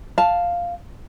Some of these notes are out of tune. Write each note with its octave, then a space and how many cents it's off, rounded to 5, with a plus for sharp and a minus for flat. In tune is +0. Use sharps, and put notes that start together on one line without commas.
F5 +0 A5 +0